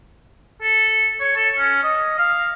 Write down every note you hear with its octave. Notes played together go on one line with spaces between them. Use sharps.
A4
C#5
A4
C#4
D#5
F5